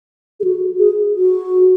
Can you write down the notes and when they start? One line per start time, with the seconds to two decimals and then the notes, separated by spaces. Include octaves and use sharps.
0.40 G#4
0.44 F#4
0.79 G#4
1.15 F#4